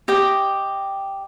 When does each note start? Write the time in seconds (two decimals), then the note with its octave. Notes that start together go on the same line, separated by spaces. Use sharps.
0.08 G4 D#5 G5